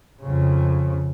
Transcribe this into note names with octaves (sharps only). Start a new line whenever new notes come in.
F2 C#3